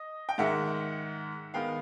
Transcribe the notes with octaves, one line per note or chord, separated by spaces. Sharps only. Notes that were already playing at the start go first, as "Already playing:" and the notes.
Already playing: D#5
G5
G#2 D#3 G#3 E5 F#5
D#3 G#3 B3 F5 G5